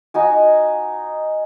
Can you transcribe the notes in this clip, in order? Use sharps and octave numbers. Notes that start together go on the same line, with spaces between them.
D#4 F#4 G#5